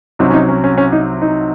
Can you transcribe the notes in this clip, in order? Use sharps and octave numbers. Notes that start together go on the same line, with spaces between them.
C2 C3 F#3 C4 D#4
C#4
D#4
C#4
C#4
C#4
D#4
D#4